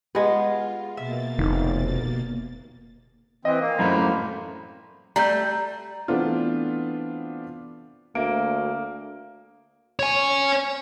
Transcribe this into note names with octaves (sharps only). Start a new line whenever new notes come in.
G#3 B3 F4 G4
B2 A#3 E5 A6
F1 D3 D#3 D#4
E3 C4 D#5
A#3
F#2 A2 A#4 C5 B5
G3 A3 A#5 G6
E3 A3 B3 C4 D4 F4
D2 A#3 E5 D7
C#5 G#5